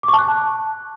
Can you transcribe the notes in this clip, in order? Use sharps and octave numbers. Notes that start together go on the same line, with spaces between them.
D6
C#6
A5
F#6